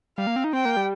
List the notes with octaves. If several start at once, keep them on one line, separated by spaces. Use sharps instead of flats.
G3 F5
A#3
C4
D#4
C4 G5
A#3
G3